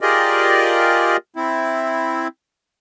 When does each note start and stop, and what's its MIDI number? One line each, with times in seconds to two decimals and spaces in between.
0.01 1.17 65
0.01 1.17 67
0.01 1.17 68
0.01 1.17 70
0.01 1.17 74
0.01 1.17 75
1.36 2.28 60
1.36 2.28 64